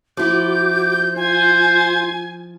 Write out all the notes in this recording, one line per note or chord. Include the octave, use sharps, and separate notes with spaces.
F3 E4 F#4 D6 G6
F4 C5 G#5